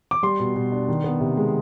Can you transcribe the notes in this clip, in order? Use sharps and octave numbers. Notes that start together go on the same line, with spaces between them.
D6
G3 C6
B2
B2
D4
D#3
B3
C3
G#3